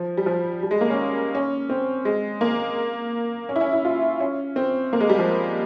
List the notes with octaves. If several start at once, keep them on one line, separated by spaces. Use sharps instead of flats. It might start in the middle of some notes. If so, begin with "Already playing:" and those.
Already playing: F3
G3
F3
G3
G#3
A#3
C#4
C#4
C4
G#3
A#3
C#4
E4
C#4
E4
F4
C#4
C4
A#3
G#3
G3
F3